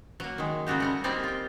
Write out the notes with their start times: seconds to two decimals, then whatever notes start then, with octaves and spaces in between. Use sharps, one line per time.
0.20 F#3 A#3
0.38 D#3 G#3
0.67 C#3 G#3 A3 F#4 G4
0.80 G3 C#4 A#5
1.04 G3 A#3 C4 D#4 G4 D5
1.24 F4 G5